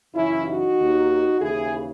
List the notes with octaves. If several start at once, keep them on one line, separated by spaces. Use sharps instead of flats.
F#2 C#3 E3 C#4 E4
D#4 F#4
D#2 D#3
D#2 C#3 E3 E4 G#4